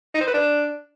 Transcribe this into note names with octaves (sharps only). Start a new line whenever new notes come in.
D#4
C5
B4
D4